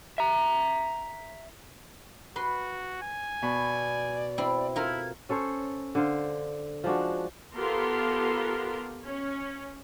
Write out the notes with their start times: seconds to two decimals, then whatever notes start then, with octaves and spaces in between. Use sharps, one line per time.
0.18 E5 A#5
2.36 F#4 B4 C6
3.02 G#5
3.42 B2 D5 B5 C#6
4.38 C4 E4
4.76 E4 F4 A4 A#4 G#6
5.29 C#4 A4 C5 C#5
5.95 D3 C5 F5
6.84 F3 G#3 D4 F#4
7.55 B3 F4 G4 A4 A#4 C6
9.04 C#4